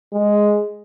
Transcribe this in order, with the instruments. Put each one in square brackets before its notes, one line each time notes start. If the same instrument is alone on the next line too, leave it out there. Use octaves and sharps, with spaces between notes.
[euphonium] G#3